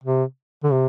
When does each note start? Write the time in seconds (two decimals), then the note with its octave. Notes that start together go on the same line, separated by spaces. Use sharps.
0.03 C3
0.63 D3
0.72 C3